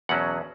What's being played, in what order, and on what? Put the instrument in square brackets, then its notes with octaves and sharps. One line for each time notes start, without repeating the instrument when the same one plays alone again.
[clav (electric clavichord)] E2 B2 F#3 C#4 F#5